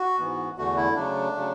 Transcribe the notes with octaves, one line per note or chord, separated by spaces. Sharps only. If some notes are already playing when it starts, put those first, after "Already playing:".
Already playing: F#4
G#2 E3 B3
E2 D3 A3 F#4
E4
C#3 F#3 A3 D4
C#3 F#3 A3